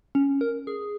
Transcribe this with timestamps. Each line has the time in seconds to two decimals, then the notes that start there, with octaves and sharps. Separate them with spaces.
0.15 C#4
0.41 A#4
0.67 G#4